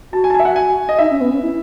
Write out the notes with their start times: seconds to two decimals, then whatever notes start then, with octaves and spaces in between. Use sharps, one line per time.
0.13 F#4 A5
0.24 G#5
0.30 A5
0.34 G#5
0.40 E5
0.45 F#5
0.56 G#5
0.89 D#5
0.99 D#4 E5
1.10 C#4
1.21 B3
1.31 C#4
1.42 E4